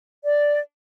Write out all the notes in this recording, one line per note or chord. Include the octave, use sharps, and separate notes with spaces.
D5